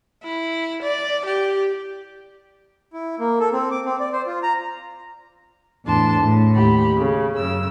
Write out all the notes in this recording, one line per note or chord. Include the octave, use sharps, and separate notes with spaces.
E4
D5
G4
E4
A#3
A4
C4
D6
C4
D5
C5
F4
A#5
E2 A2 D4 A5 C6
A2
D#2 G4 B5
C#3
F#2 C#3 E6